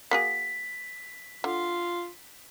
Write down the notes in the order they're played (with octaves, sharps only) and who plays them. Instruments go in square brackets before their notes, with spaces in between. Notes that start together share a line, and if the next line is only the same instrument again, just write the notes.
[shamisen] A#3 F#4 G#4 [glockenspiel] B6
[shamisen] D3 [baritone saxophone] F4